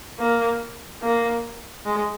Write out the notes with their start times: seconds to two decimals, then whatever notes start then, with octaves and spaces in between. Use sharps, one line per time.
0.19 A#3
1.03 A#3
1.86 G#3